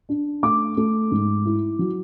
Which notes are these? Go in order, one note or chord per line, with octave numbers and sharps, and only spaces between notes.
D4
A3 D6
A3
G#2
E4
F#3